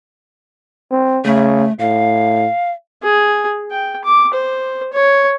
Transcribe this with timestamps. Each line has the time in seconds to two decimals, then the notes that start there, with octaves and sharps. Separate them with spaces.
0.91 C4
1.25 C#3 A3
1.79 A2 F5
3.03 G#4
3.71 G5
4.04 D6
4.34 C5
4.93 C#5